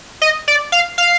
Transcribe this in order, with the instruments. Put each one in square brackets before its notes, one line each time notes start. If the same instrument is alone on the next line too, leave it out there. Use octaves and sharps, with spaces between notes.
[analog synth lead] D#5
D5
F5
F5